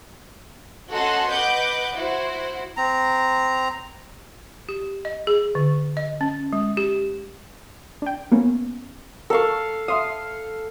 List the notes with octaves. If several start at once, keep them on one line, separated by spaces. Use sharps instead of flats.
C#4 F#4 A4 D#5 F#5 C6
B4 D#5 F#5 D6 G6
E4 F#4 C5
C4 A#5
G4
D#5
G#4
D3
D#5
C#4
G#3
G4
D4 G5
A#3 B3 C#4
A4 A#4 F5 C#6
E5 F5 C6 D#6